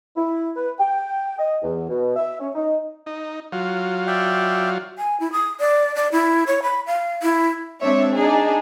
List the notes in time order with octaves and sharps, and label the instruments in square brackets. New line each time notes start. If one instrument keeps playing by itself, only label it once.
[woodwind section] E4
B4
G5
D#5
E2
B2
E5
C#4
D#4
[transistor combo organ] D#4
F#3 F4
[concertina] D5 E5 G5
[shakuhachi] G#5
E4
D#6
D5
D5
E4
C#5
B5
F5
E4
[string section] G#3 C4 D4 C#5 E5
D4 D#4 G#4